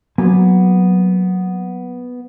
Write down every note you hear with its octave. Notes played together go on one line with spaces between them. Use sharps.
F#3 A#3 B3 G#5